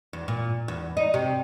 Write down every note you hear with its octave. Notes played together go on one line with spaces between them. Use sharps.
E2
A#2
E2
D#4
C3